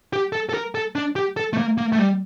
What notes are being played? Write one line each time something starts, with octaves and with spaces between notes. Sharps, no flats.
G4
A4
A4
A#4
A4
D4
G4
A4
A3
A#3
A#3
A3
G3